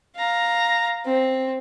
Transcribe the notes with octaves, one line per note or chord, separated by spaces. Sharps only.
F5 A#5
C4